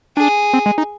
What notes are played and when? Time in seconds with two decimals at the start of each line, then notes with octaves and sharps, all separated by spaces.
0.17 D4 G#4
0.54 C4
0.66 G#3
0.78 D#4